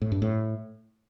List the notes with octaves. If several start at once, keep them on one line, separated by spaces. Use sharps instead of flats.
A2
G2
A2